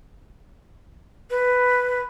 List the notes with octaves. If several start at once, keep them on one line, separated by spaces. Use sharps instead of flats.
B4